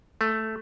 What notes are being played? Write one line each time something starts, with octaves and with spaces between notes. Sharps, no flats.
A3